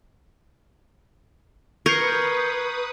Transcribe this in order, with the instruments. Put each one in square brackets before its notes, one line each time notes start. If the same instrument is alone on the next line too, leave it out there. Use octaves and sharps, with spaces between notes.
[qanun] A#4 [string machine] B4 D#6 [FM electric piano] C#6 G6 C#7 [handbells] G#6 C7